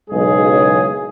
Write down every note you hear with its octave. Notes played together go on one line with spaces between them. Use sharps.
F#1 B1 C#3 G#3 G#4